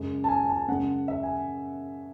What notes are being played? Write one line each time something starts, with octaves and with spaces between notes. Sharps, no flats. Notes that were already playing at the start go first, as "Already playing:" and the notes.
Already playing: F#2 C#3 G#3
A5
G#5
G#5
A5
F#2 C#3 G#3 F#5
E5
G#5